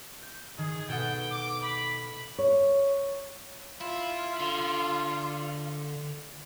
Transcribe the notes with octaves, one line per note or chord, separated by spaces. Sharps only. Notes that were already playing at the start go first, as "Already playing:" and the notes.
G6
D#3 G#4
B2 A4 F#5 G5
D6
B5
C#5
F4 E5 B5
D3